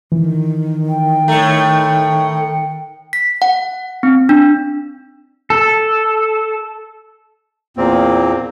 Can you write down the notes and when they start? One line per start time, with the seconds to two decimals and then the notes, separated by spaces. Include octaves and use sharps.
0.12 D#3 E3
0.89 G5
1.28 A2 A3 A#5 C#7
3.13 B6
3.42 F#5
4.03 C4
4.29 D4
5.50 A4
7.77 E2 A#2 A#3 C4